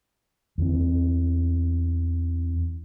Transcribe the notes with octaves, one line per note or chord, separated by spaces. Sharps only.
E2 E3 C4